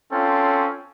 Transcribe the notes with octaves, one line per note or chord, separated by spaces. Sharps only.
C4 C#4 F4 A4